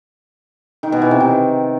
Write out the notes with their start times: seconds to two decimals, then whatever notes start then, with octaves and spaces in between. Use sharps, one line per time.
0.83 D#3
0.92 B2
1.02 E3
1.11 C3
1.20 D#3